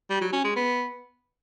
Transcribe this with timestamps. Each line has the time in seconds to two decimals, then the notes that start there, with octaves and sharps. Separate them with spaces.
0.10 G3
0.21 F#3
0.33 C#4
0.44 G#3
0.56 B3